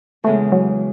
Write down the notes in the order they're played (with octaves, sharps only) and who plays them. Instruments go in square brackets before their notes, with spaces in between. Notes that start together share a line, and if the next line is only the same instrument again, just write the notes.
[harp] E2 C#3 G#3 [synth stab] A3
[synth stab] F#3